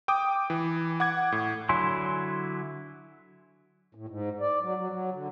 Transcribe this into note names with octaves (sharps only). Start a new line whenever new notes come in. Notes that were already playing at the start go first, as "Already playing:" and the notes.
G5 D6 D#6
E3
F#5 D6 G#6
A2
D3 F#3 E4 G#5 C6
A2
G#2
D5
F#3
F#3
F#3
D3